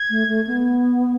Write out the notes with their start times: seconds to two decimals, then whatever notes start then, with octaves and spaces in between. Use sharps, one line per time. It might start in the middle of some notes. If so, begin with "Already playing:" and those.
Already playing: G#6
0.10 A3
0.28 A3
0.47 B3